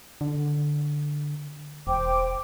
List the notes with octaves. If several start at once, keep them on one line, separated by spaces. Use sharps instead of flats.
D3
E1 C5 G5 D6